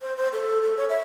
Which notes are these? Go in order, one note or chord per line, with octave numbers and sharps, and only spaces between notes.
C5
C5
A4
A4
C#5
E5